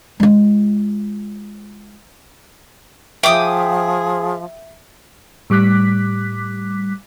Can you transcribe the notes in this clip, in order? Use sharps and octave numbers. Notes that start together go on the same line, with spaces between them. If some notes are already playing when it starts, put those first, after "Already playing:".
G#3 F4
F3 G#4 E5 G5 D6 D#6
A2 G3 D6 F#6 B6